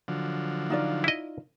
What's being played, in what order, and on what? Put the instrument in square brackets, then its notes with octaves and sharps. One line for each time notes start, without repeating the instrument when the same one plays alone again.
[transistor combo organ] D3 F3 F#3
[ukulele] D#4 F4 D5
[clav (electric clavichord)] E4 D#5